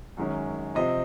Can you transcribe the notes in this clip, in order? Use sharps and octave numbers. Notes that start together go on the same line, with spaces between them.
F#2 D#3 G#3 C#4
C3 F3 C4 D#5